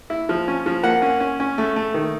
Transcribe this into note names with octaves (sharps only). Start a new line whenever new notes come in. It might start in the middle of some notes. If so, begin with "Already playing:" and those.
E4
F3
C#4
F3
A#3 F#5
C#4
C#4
C#4
A3
A3
D#3